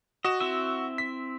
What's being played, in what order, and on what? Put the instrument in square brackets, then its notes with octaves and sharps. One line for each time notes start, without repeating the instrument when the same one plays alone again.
[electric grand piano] F#4 E7 [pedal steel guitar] D#5
[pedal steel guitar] C4 E4 E5
[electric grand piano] B6